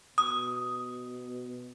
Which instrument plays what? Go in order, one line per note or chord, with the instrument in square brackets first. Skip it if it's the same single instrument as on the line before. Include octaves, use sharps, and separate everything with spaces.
[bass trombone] B2 [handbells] D#6